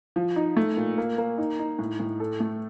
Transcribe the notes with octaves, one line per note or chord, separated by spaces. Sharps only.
F3
D#4
A3
A#2
A#3
A#3
D#4
D#4
A2
A2
A4
A3